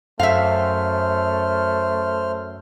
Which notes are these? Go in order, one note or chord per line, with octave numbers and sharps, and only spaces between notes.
F#2 A3 C5 E5 F5 F6